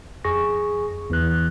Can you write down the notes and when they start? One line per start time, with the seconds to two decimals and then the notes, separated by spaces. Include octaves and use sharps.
0.24 F2 G#4 C#6 A#6
1.10 E2 E3 F#6